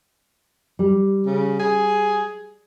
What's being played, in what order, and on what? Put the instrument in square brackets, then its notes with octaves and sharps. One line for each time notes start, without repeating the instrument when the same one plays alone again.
[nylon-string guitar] G3
[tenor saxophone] C#3
G#4